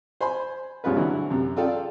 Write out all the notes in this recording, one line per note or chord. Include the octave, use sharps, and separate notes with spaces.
C5 G#5 B5 C6
A#1 G2 G#3 C#4 F4 B4
D3 E3 F#3 B3 E4 F#4
F#2 C3
F4 G#4 A4 D5 F5 G5